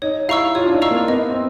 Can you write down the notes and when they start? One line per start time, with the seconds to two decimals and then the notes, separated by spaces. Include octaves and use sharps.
0.02 D#4 C#5
0.29 E4 F5 A#5 C#6 E6
0.55 F4 C#5
0.66 D4
0.73 D#4
0.82 F5 A#5 C#6 E6
0.91 A#3
1.08 B3 D#5
1.30 C4